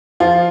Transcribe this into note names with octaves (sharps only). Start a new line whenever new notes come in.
F3 F4